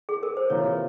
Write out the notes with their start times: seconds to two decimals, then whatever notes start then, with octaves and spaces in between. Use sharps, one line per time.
0.09 G#4
0.23 A#4
0.37 C5
0.50 C3 E3 A#3 F4 A#4 C#5